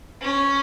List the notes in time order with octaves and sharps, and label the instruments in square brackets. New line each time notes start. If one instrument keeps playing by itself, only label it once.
[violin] C#4